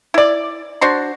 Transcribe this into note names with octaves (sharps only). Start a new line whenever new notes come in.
E4 D5
D4 F#4 C5 C6